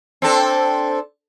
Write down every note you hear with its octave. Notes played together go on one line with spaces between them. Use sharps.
C4 D4 A4